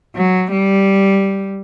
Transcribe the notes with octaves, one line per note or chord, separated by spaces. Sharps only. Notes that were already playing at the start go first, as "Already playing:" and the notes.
F#3
G3